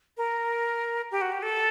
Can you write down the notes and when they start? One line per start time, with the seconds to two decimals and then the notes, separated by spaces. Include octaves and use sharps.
0.17 A#4
1.11 G4
1.21 F#4
1.32 G4
1.43 A4